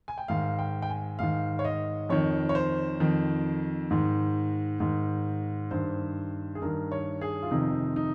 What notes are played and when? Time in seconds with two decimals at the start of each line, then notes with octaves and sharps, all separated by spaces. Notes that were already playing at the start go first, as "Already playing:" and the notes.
0.08 G#5
0.18 G5
0.28 G#2 D#3 F5
0.59 G5
0.82 G5
0.90 G#5
1.19 G#2 D#3 F5
1.59 C#5
1.65 D#5
2.09 F2 D#3 C#5
2.49 C#5
2.55 C5
3.00 F2 D#3
3.91 G#2 D#3
4.80 G#2 D#3
5.71 G2 D#3 C5
6.55 G#4
6.62 G2 D#3 A#4
6.92 C#5
7.21 G#4
7.43 F4
7.51 F2 C3 D#3 D#4
7.96 D#4